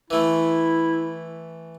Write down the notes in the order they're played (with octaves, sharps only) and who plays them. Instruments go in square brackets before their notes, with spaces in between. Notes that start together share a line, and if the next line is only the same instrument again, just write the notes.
[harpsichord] E3 A3 [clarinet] E4